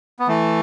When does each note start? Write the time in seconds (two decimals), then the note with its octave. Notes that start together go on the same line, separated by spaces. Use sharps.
0.20 B3
0.28 E3 A3